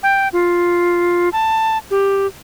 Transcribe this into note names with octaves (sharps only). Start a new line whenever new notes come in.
G5
F4
A5
G4